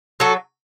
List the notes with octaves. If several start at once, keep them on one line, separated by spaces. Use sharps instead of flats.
F#3 F#4 A4